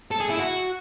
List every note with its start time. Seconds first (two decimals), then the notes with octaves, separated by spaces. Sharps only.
0.11 A4
0.21 G#4
0.30 E4
0.39 F#4